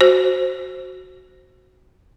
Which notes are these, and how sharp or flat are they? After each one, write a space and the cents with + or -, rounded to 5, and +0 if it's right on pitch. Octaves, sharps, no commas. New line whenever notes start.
F#4 +0 C5 +5